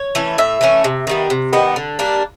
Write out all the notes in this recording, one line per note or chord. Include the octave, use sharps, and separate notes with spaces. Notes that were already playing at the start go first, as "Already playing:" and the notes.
Already playing: C#5
E3 A3 C#4
A2 E5
E3 A3 C#4
C3
D#3 G3 B3
C3
D#3 G3 B3
D3
G3 A#3 D4